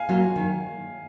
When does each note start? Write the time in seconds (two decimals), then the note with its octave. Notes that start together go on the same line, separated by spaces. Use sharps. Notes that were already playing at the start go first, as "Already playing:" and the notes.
Already playing: F5 G#5
0.09 F#3 A#3 F4
0.36 D#3